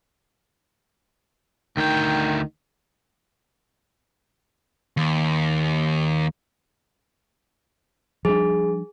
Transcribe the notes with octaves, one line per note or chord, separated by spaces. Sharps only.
D2 D#3 G5
D#2
F3 G3 D4 G#4